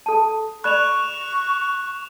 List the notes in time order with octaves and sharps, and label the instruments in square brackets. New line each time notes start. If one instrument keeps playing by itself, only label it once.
[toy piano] A4 A5
[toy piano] D5 B5 [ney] C#6 [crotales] F#6 E7 F7